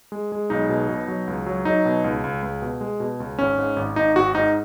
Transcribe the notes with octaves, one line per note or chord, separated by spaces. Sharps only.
G#3
G#3
B1 D#4
B2
B2
F#3
C#2
F#3
F#3 D#4
B2
C#2
C#2
C#2
B2
G#3
B2
C#2
G#1 C#4
G#2
G#1
G#1 D#4
G#1 F#4
G#2 D#4